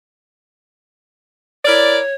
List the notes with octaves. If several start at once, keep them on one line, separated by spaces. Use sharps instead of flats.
E4 A#4 C#5 D5